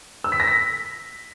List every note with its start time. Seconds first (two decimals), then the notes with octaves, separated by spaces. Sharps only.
0.24 E6
0.32 B6
0.40 A#6
0.47 B6